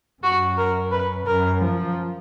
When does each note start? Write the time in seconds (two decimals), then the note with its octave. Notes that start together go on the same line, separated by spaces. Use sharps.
0.22 F#2 F#4
0.58 A#4
0.92 B4
1.26 F#2 A#4
1.61 F3